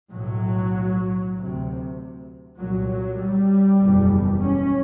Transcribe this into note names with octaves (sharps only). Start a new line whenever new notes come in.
B1 A2 F#3
D2 C3
C2 A#2 F#3
F#3
G3
F#1 E2 B2
C#4